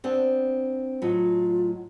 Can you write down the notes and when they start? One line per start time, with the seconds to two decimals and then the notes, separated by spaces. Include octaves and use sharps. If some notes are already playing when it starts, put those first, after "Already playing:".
0.04 B3 C4 D4
1.02 A2 F#3 F4 D#5